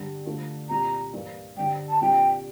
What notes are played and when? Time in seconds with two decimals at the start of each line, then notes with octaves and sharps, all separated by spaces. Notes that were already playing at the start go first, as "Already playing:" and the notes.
Already playing: G2 D3 G3
0.26 D3 A3 D4 F4 A4
0.69 C2 A#2 G3 A#5
1.14 G2 E3 A#3 E4
1.57 G2 D3 G3 G5
1.89 A5
2.01 C2 A#2 G3 D4 G5